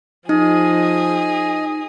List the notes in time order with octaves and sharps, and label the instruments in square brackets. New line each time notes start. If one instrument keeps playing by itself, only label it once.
[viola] F3 [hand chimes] D#4 [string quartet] G#4 [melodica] D#5